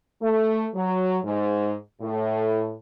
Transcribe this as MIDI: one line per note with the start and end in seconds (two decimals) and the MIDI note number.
0.22 0.66 57
0.75 1.18 54
1.24 1.73 44
2.01 2.74 45